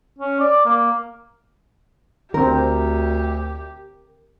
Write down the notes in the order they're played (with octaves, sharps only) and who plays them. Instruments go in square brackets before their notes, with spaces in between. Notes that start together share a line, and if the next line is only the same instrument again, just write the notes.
[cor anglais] C#4
D5
A#3
[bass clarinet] D2 [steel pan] D3 C4 [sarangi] G4 [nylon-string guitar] A#4